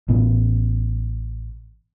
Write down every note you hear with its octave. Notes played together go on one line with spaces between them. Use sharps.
A1 A2 B3